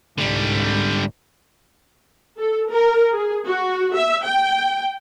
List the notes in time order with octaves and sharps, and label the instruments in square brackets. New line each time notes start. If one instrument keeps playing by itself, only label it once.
[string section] C2 G#2 [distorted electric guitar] D3 G3
[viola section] A4
A#4
G#4
F#4
E5
G5